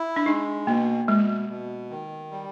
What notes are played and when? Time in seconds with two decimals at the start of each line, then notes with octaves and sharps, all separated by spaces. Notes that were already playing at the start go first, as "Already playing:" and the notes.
Already playing: E4
0.16 D4
0.26 G#3 D#4
0.67 B2 A#3
1.08 B2 G#3
1.49 B2
1.90 D#3
2.31 G3